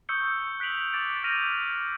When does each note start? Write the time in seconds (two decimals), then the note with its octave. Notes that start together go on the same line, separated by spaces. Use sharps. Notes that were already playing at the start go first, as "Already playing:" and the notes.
0.09 C#6 D#6 E6 G6 C#7 G7
0.60 F#6 B6 D7 F7 F#7
0.93 D6 A6 D7
1.24 F6 G6 A#6 D#7 F7